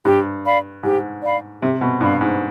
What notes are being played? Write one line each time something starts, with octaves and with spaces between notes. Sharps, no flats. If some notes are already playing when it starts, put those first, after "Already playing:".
G2 G4
D5 F5 B5
G#2 G4
D5 F5 B5
C3 G4
B2
G2 D5 F5 B5
G#2